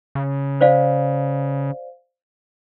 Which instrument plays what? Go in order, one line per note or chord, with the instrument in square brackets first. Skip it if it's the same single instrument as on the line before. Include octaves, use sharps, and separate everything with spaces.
[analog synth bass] C#3
[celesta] C5 D5 F5